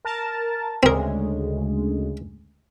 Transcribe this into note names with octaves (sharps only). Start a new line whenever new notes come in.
A#4 A5
D2 C#3 G#3 C4 A#4